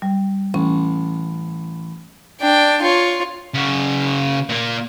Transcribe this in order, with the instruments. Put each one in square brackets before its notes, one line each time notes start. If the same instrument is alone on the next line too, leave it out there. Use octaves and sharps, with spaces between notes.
[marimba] G3
[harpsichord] A1 [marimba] C#4
[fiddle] D4 G5
F4 C#5
[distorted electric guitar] C#3 F#4
A#2 A#3